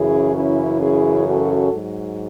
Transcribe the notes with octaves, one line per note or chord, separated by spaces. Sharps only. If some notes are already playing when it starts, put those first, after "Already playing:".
Already playing: F#2 C#3 E3 E4 G#4
C#4 E4
E4 G#4
F#4 A4
G#2 F#3